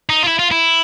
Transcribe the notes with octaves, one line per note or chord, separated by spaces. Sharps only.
D#4
F4
E4
F4
E4